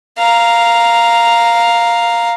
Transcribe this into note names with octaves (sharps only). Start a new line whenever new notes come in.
F5 A#5